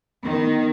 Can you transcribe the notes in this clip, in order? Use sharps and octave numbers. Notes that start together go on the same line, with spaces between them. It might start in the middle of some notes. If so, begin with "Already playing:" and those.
D#3 B3